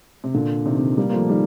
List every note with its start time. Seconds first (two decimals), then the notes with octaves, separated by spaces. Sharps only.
0.24 C3
0.34 A#2 D3
0.66 C3 D#3
0.77 C3 D#3
0.97 G3 A#3
1.09 A#3
1.13 F3 A3
1.29 D#3 G3